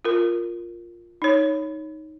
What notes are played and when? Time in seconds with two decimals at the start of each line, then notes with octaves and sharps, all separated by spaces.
0.05 F4 A#4
1.22 D#4 C#5